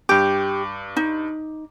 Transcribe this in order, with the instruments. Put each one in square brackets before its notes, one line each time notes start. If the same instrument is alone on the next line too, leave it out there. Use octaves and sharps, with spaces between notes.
[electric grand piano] G2 D6 [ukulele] G4
[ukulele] D#4